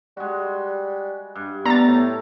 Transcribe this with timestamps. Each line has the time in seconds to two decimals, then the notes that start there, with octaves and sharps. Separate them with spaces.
0.17 G3 G#3 F#4
1.35 G2
1.66 A3 B3 D4 A#5 A6
1.88 A2